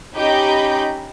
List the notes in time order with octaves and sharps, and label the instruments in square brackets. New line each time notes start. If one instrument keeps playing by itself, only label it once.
[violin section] C#4 D#4 G4 D#5 B5 G6